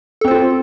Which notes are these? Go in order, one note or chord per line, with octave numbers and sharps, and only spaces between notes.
C4 F4 A4 C5